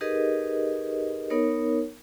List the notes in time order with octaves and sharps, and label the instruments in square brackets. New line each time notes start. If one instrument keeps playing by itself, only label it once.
[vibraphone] D#4 G4 G#4 A#4 B4 D#5
B3 D#4 A#4 C#5